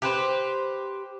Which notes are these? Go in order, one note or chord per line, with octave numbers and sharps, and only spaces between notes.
G4 B4 C5